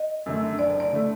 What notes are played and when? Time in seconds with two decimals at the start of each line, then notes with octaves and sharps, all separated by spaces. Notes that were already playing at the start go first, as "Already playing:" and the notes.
Already playing: D#5
0.26 F#2 D3 A3
0.59 F#1 D5
0.80 D5
0.93 D3 A3